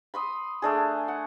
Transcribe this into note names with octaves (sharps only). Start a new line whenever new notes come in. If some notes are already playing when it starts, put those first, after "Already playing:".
B5 C6 D#6
A3 D4 G#4
F#5